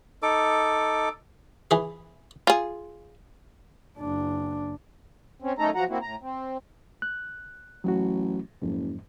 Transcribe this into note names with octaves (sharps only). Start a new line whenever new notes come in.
D#4 A4 D6
E3 G#4
F4 G#4
F#1 D4
C4 C#4
F#2 A3 C#4 D#4 A4 A#5
F3 F#3 F#4 F#5 A#5
A#3 C4 E4 F#4
A2 A#5
C4
F#6
A1 F#3 F#4
F#1 F2 G#2